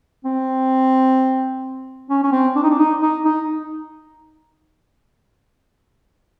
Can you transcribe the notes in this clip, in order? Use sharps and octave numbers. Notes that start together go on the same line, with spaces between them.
C4
C#4
C#4
C4
D4
D#4
D4
D#4
D#4
D#4